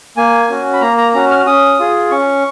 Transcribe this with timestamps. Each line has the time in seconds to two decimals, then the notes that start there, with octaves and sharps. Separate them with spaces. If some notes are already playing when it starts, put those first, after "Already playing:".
0.17 A#3 G#5
0.49 C#4 F#4
0.73 B5
0.81 A#3 A#5
0.98 A#5
1.14 C#4 F#4 A#5
1.30 F6
1.46 C#4 D#6
1.79 F4 G#4
2.11 C#4 C#6